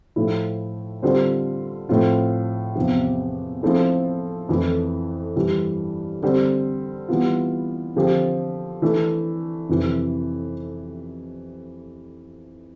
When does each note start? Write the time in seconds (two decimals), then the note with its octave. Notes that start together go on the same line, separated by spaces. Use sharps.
0.16 A2 F3 A3 E4
1.02 D3 G3 C4 F4 C5
1.89 A2 F3 A3 C4 F4
2.76 E2 C3 F3
3.63 F3 A3 C4 E4 A4
4.49 F2 E3 A3 E4
5.36 G2 E3 G3
6.22 D3 G3 C4
7.08 E3 G3 B3 F4
7.96 D3 F3 C4 G4
8.82 E3 A3 D4
9.69 F2 C3 E3